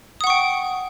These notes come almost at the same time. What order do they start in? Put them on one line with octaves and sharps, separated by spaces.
D#6 F#5 C#6 G5